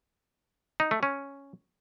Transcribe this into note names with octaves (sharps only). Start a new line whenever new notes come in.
D#4
A3
C#4